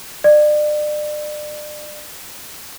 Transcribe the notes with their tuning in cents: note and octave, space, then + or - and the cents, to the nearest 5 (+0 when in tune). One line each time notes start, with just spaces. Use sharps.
D5 +35